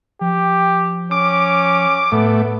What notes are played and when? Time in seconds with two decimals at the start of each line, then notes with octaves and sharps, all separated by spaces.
0.21 F3 G4
1.11 C#4 D6
2.12 A2 A3 B3